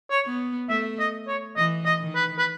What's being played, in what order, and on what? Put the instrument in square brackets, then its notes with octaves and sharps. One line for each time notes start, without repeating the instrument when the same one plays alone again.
[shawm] C#5
[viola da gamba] B3
[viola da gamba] A3 [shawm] E5
[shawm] D#5
C#5
[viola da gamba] E3 [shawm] D#5
[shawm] D#5
[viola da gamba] D#3
[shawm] B4
B4